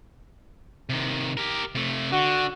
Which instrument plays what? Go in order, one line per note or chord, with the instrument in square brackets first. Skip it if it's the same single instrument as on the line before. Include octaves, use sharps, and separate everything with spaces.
[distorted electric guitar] C3 D#3
G4 A#4
C3 A3
[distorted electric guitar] D3 [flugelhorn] F#4